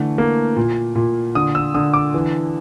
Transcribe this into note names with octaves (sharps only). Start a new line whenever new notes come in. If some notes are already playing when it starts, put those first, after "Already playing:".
Already playing: D3 E3 A3
A#3
A#2
A#2
D3 D#6
E6
D3 D#6
D6
E3